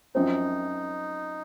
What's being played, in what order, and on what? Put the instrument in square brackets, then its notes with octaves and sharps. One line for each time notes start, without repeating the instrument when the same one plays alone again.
[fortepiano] F#2 F3 C4 [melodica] D#4